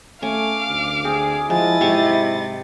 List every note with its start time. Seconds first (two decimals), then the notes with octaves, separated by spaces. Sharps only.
0.23 A3 C#4 F5 D6
0.69 D2
1.05 C4 G#4
1.50 F3 G#3 E4 D#5 A6
1.81 G#2 C3 F#3 C#6